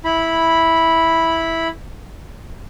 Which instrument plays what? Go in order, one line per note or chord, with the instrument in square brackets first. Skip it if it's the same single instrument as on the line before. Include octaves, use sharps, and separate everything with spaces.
[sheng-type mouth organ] E4 B5